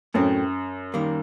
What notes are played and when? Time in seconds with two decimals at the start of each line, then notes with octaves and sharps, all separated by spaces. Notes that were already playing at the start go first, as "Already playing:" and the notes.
0.14 F#2 A2 F#3 A3 C4
0.94 D#3 G3 A#3